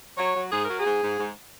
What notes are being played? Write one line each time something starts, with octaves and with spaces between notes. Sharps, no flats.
F#3 C#5
F#3
G#2 G#4
F#3 A#4
G#4
G#2
G#2
G#2